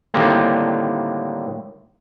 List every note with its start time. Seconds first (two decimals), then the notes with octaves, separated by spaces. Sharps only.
0.14 A2 D3 D#3 G3 A#3 C4